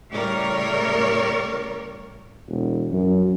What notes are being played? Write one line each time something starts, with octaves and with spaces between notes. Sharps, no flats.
A2 C#3 G3 A#4 C#5 D5
E1
F#2